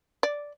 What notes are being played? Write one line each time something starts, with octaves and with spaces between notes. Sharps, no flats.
D5